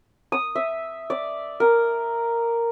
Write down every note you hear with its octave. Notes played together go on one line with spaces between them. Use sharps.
D#6
E5
D5
A#4